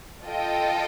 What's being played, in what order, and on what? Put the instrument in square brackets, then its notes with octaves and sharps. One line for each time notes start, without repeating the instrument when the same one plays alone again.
[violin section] F4 A4 D#5 G5